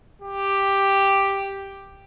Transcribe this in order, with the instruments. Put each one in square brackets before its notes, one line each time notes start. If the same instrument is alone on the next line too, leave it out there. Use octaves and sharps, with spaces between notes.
[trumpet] G4